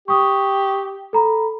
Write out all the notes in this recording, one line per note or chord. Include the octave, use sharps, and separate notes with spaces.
G4 C#6 D#6
A4 A#5 B5